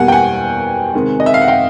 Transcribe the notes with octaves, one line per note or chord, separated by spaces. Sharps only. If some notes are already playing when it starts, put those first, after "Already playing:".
Already playing: E2 B2 G3 A#3 F#5 G#5
G5
F#5 G#5
C3 D#3 G#3
D#5
E5
F5
F#5
F5 G5